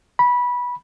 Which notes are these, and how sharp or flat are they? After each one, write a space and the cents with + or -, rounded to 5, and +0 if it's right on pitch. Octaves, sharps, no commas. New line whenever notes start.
B5 -15